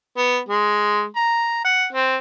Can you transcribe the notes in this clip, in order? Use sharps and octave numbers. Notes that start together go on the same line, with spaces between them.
B3
G#3
A#5
F#5
C4